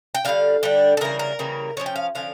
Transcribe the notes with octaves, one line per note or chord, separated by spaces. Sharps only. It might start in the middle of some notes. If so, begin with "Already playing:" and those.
G5
D3 G3 D4 F5
D3 G3 D4 G5
A4
C#3 E3 G3 A#3 A#4
A#4
C#3 E3 G3 A#3
D3 F3 C#4 C#5
G5
F5
D3 F3 C#4 F5